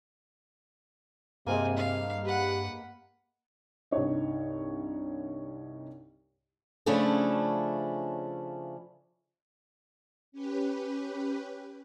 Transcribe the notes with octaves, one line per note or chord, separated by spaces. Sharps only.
G2 C3 G#3 A#3 C4 G#5
F5
G4 B4 F#5
C2 G2 D#4 C#5 D#5
C#3 F3 A3 C#4 D4 E4
C#4 G4 B4